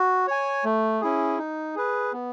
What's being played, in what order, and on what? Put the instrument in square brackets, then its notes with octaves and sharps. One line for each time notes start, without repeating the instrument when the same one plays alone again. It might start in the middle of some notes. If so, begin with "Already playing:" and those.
Already playing: [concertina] F#4
C#5 G#5
A3
C#4 E4 G#4
D#4
G#4 B4
B3